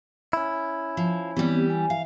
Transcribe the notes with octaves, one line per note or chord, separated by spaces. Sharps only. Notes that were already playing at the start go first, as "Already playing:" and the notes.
C#4 E4
F3
E3 G3 B3 C4 G4
G#5
E5 F5